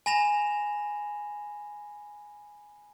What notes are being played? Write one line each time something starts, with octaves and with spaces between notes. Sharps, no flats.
G#5 B5 A#6 E7 F7